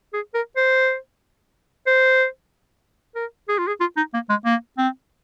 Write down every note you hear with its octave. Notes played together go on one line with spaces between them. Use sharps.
G#4
A#4
C5
C5
A#4
G#4
F4
G#4
F4
D#4
A#3
G#3
A#3
C4